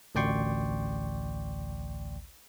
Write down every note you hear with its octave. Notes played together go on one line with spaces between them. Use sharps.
A1 D2 D5 G5 C6 C#6